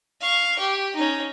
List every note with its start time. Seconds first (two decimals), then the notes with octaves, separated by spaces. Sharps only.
0.21 F5 C#6
0.59 G4
0.96 C#4 D#4